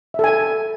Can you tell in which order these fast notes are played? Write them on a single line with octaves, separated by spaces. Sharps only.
E5 A4 G#5